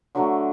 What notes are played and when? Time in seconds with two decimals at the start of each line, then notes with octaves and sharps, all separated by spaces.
0.15 D3 F#3 A3